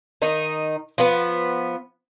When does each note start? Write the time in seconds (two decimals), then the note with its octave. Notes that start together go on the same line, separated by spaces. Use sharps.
0.22 D#3 D#4
0.98 F3 B3